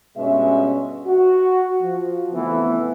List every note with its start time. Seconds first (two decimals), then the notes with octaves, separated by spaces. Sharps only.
0.17 G2 B2 G#3 C#4 E5
1.07 F#4
1.82 F3
2.34 F2 C#3 E3 A3 B3